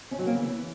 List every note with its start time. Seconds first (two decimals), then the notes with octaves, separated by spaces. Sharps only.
0.11 C#4
0.19 F#3
0.26 A#3
0.33 C#3
0.41 E3